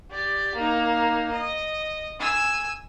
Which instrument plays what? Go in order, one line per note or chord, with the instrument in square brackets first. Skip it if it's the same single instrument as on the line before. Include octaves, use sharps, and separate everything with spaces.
[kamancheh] G4 D5
A#3 D#4
D#5
G#5 E6